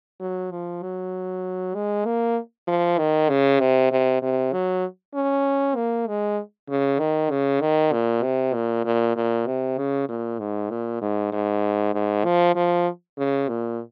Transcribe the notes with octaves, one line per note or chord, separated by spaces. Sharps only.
F#3
F3
F#3
G#3
A#3
F3
D#3
C#3
C3
C3
C3
F#3
C#4
A#3
G#3
C#3
D#3
C#3
D#3
A#2
C3
A#2
A#2
A#2
C3
C#3
A#2
G#2
A#2
G#2
G#2
G#2
F3
F3
C#3
A#2